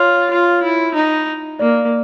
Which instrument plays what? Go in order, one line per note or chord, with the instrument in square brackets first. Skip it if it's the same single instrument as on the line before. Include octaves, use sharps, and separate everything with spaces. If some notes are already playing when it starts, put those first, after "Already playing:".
Already playing: [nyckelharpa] F4 [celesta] C#5
[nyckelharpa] F4
E4
D#4
[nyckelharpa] A#3 [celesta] D5